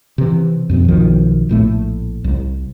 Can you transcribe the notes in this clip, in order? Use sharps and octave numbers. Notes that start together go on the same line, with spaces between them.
C3 E3
F2 B2 F3 C4
B1 B2 D#3 F3
A#1 A2 A3
C2